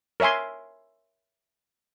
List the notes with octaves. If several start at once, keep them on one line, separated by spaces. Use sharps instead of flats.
A#4 C#5 E5 G#5 C6